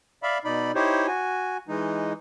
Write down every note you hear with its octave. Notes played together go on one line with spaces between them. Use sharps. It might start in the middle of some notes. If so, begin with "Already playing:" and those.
D5 E5 F5 B5
B2 D#4 D5 B5
D#4 E4 G4 C5 C#5
F#4 G#5
E3 G#3 D#4